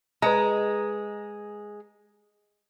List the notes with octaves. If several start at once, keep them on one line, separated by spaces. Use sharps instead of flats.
G#3 B4 D#5 A#5